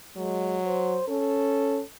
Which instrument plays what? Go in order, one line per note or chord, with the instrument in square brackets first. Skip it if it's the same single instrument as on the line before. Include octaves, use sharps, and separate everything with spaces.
[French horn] F#3 [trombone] G#3
[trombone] C5
[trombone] C#4 [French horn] A4